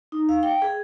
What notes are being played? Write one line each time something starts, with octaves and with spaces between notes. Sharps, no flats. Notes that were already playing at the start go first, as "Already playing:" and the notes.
D#4
F5
G5
G#4